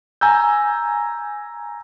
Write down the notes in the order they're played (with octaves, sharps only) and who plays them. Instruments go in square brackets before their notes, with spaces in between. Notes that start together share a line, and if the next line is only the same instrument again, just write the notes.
[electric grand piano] G#5 A#5 E6 G6